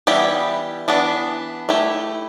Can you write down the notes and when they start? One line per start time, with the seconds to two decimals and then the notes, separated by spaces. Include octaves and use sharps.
0.07 E3 G3 B3 E4 G4
0.88 E3 B3 D4
1.69 A3 E4 G4